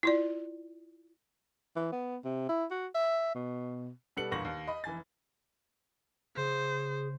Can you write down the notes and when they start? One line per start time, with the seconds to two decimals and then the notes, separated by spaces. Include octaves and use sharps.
0.03 E4 F4 D5
1.76 E3
1.92 B3
2.24 C3
2.49 E4
2.71 F#4
2.94 E5
3.35 B2
4.17 B2 G3 A4 B4 C#7 F#7
4.31 G1 E2 A#2 C#6 A#6 F#7
4.45 D#2
4.67 D#5 B5
4.84 F1 E3 G#5 A6
6.36 C#3 G#4 C5